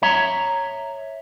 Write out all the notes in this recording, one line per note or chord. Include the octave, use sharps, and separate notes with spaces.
C#5 E5 A#5